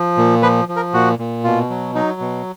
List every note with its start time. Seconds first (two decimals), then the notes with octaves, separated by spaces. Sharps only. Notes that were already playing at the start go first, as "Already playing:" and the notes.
Already playing: F3
0.18 A#2
0.43 F3 B4
0.68 F3
0.76 A#4
0.94 A#2 F#4
1.19 A#2
1.44 B2 F4
1.70 F#3
1.95 F#3 D#4
2.20 B2